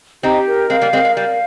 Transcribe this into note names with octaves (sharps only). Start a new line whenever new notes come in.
C4 D#4 G4
A#4
G#3 C4 F5
G3 A#3
G#3 C4 A#4
G#3
G3 F5